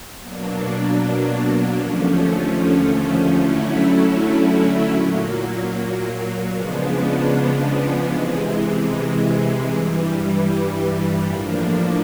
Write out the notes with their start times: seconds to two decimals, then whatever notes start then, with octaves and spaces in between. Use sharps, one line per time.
0.19 B2 F#3 A#3 D4
1.77 D#2 D3 F3 A3 C#4
3.35 D3 F#3 A3 C#4 E4
4.93 A#2 F#3 A#3
6.51 C#3 F3 G#3 B3 D4
8.09 C3 E3 G#3
9.67 G2 E3 G3
11.24 A2 F3 A#3 D4